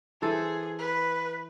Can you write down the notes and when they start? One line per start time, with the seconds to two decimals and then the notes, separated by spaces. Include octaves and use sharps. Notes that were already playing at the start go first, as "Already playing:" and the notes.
0.22 E3 G#4 A4 C5
0.79 B4